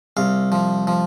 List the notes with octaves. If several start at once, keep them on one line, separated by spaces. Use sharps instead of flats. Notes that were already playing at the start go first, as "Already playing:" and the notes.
C2 F5
F3
F3